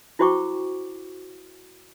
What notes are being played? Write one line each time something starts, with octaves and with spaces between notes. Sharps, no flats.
E4 F#4 C5 G5 C#6 D6